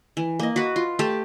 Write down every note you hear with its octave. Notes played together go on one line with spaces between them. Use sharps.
E3
A#3 D#5
F#4 B4
F4
A3 G4 A5